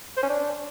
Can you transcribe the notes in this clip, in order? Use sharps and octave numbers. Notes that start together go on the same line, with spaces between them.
C5
C#4
D4